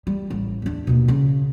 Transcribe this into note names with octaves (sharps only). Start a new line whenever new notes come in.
G3
A1
E2 D4
D#2 B2
C#3